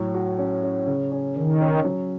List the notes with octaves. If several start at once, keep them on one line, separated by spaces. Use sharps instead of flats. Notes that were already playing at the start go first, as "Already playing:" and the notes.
Already playing: A2 F#3
F#4
C#4
C#4
C#3
C#4
D#3 C#4
C#4
F#3